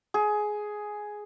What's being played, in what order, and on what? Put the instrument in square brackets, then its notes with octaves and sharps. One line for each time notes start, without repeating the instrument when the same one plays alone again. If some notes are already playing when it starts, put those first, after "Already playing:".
[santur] G#4